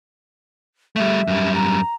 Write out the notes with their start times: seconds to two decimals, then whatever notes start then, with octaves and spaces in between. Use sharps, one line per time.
0.96 G3 A3 E5
1.28 F#2 G3
1.55 A#5